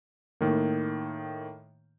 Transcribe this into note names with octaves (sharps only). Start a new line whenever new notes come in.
A2 D#3 A#3